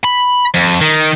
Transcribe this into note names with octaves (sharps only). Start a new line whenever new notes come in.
B5
F2
D#3